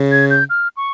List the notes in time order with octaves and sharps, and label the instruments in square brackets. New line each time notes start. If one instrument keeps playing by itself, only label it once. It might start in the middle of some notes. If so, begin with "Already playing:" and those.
Already playing: [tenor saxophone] C#3
[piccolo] G#6
G6
F6
C#6